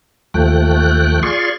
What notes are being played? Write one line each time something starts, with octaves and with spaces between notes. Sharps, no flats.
D#2 F3 A3 G5 F#6
F4 G#4 D5 C6 C#6